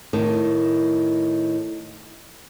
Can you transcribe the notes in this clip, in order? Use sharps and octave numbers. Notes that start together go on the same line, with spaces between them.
A2 D#3